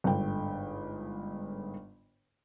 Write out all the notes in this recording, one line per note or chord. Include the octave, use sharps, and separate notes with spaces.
G1 G#2 D3 G5